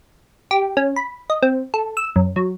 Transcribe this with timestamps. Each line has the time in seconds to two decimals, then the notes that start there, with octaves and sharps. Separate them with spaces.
0.51 G4
0.77 C#4
0.96 B5
1.30 D#5
1.43 C4
1.74 A4
1.97 E6
2.16 F#2
2.36 F#3